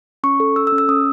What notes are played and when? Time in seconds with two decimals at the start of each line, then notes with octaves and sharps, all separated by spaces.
0.24 C#4 C#6
0.40 A4
0.56 A4 E6
0.67 E6
0.72 C#4
0.78 E6
0.89 C#4 D#6